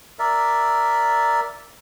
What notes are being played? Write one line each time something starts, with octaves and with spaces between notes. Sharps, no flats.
A#4 D5 E5